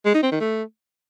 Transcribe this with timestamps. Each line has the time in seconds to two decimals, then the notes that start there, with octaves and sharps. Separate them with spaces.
0.06 G#3
0.14 D#4
0.23 C4
0.32 D#3
0.40 A3